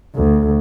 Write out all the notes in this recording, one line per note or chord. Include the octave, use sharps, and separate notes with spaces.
D2